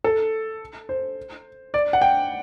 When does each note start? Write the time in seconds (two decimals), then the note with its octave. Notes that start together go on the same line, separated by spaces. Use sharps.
0.04 A4
0.89 C5
1.74 D5
1.93 F#5
2.02 G5